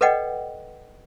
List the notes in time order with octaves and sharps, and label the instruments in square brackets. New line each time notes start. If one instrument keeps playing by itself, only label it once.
[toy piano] A4 B4 D5 D#5 F#5 G5